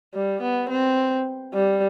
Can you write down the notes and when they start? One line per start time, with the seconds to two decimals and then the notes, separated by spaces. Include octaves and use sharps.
0.14 G3
0.42 B3
0.69 C4
1.54 G3